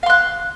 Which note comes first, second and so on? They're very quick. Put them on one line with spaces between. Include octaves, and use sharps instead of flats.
F5 C6 F#6